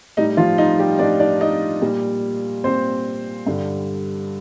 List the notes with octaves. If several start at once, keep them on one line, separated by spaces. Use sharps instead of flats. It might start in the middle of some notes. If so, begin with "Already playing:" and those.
A2 G3 D#4
F3 F4
D#4
G3 G4
A2 G3 D4 D5
D4 D5
D#4 D#5
A#2 G3
A#2 G3 C4 C5
G2 D3 G3